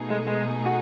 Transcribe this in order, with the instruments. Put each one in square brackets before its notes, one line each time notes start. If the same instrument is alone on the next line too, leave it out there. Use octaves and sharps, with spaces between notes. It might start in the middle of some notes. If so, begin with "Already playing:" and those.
Already playing: [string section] B2 A3 D#4 G#4
[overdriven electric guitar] G#3
G#3
F#4